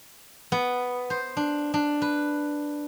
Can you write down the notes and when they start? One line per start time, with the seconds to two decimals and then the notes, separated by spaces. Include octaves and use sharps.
0.52 B3
1.10 C5
1.37 D4
1.74 D4
2.02 B4